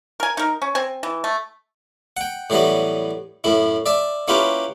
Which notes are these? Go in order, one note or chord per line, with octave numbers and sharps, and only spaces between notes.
A#4 G#5
D#4 A#4
C#4
C4 G#5
E3
A3
F#5 G5
A2 E3 F#3 G3 B3
F#2 A2 E4
D5 E5 A5
A#3 C#4 E4 F4 G4 B4